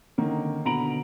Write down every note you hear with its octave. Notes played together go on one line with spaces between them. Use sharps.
D3 D#3 A#3 C#4
B2 D3 A#5 B5 D7 F#7